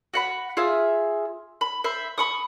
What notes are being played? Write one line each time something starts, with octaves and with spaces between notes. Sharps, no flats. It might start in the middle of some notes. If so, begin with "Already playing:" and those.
F#4 F#5 B5
F4 G#4 E5
B5
C5 E5 B5
B5 C#6 D#6